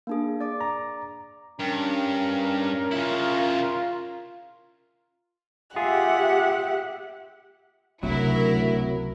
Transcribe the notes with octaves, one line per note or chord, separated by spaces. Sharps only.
A#3 D4 G#4
D5 D6
A#5
G2 C#4 A#4
C#3 E4 F4
F4 G4 G#4 E5 F#5
D1 C#2 C3 F#3 E4 A#4